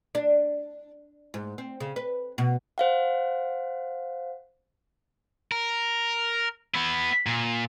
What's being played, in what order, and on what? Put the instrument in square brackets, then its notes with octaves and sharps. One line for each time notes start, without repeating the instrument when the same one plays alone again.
[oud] D4
G#2
C4
C#3
B4
B2
[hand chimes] C5 F5 F#5
[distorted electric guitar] A#4
B3 E4
A#2